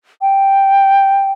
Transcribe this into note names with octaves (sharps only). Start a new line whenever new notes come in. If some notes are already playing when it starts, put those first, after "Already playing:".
G5